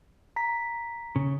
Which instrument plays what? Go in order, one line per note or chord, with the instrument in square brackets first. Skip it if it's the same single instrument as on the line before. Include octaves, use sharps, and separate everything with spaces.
[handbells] A#5 B6
[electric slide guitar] C#3